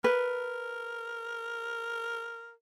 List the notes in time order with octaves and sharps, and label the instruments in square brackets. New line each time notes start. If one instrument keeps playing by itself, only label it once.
[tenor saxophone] A#4 [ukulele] B4